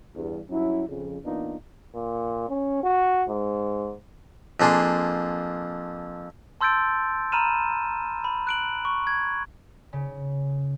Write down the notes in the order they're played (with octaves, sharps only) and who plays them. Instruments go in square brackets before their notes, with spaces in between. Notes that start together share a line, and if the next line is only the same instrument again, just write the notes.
[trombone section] E2 G2
G2 F#3 C#4 E4
F2 C#3
E3 A#3 B3 D4 D#4 F4
[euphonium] A#2
C#4
F#4
G#2
[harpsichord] F2 A#3 D4 G#4 C6
[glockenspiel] A5 C6 E6 G6 A6 D7
A#5 B5 F6 D#7 E7
B5
F#6 D7 F#7
C#6
G#6
[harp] C#3